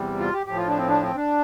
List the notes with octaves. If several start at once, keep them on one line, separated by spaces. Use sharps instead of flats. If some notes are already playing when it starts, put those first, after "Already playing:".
Already playing: E2 C3 G3
F4
G4
A2 F3 G4
F4
D4
C4
D4
C4
D4